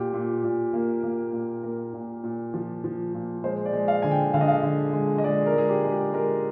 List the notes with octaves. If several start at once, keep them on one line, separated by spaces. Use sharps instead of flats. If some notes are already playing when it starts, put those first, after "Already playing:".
Already playing: A#2 G4
A#2
A#2
A#3
A#3
A#2
A#3 A#4
A#2
A#2
F3
F3
A#2
G#3 C5
D5
G#3
F5
D3 G#5
G5
D3 F5
D#5
F5
D3
G#3
D#5
G#3 D5
A#4
G#3 G#4
G4
G#3
G4
G#3 A#4